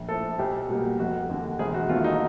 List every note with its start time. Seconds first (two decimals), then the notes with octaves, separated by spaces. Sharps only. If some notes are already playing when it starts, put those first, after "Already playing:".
Already playing: A#1
0.09 A2 F3 A4
0.39 B1 G4
0.69 B2 G3 A#3
0.99 F1 F#4
1.29 D#2 D3
1.59 E1 G#4
1.74 F#4
1.89 D#2 D#3 F#3 A3 F4
2.04 D#4